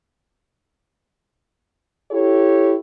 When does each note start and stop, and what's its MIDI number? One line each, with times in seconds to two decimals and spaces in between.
2.12 2.75 64
2.12 2.75 67
2.12 2.75 69
2.12 2.75 73